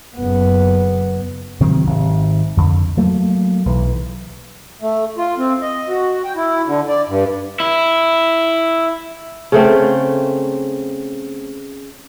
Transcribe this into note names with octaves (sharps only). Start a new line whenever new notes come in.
F#1 B3
C3 D#3 F#3 C4
G#1 C3
F2 D3
F#3 A3 A#3
B1 E3
A3
F4
C4
D#5
F#4
G5
E4
D3
D5
G2
E4
C#3 A3 C4